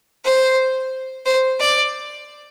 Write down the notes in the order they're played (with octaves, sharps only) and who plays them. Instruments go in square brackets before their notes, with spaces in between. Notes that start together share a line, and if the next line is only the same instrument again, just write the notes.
[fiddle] C5
C5
D5